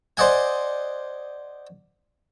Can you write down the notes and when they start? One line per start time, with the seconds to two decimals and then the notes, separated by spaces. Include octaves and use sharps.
0.17 C5 D5 D#5 F#5 G#5